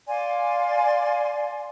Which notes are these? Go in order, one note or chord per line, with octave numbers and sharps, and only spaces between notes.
D5 F5 G#5 C6